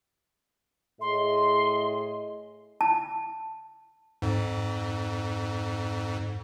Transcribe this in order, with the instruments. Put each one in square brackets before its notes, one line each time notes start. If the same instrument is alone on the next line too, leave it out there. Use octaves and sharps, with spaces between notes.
[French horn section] A2 G#4 D#5 [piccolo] C6
[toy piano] A5
[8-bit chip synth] F2 G#2